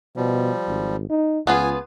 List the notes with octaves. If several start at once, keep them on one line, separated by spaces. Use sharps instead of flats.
B2 F3 G3
G#1
D#4
C#2 B3 F4 G#4 G#5